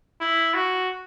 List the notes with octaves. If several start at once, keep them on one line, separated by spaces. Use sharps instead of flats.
E4
F#4